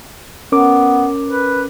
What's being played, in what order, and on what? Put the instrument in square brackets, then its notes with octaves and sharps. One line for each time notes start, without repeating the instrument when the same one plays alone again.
[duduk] B3 [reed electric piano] C#4 A#4 D6
[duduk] B4